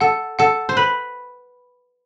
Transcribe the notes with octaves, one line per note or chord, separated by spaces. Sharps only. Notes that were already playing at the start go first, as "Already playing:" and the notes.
A4 F#5
A4 F#5
C5
B4 B5